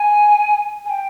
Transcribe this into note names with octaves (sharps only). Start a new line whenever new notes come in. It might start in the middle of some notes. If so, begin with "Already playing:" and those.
Already playing: G#5
G#5
G5